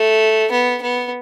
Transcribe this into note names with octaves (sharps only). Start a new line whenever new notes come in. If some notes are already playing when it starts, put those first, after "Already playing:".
Already playing: A3
B3
B3